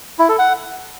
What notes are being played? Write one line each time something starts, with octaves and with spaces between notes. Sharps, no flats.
E4
A4
F#5